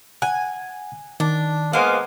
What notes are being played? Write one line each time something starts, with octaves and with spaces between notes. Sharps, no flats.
F#5 G#5 F#6
D#3 D4
G#3 A#3 B3 C5 F5